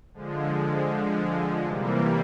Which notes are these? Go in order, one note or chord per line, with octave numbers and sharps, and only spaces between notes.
D3 F3 G#3
C3 E3 G3 A#3